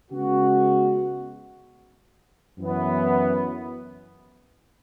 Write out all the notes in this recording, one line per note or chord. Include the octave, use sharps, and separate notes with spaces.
C#3 G#3 B3 F#4
F#2 E3 B3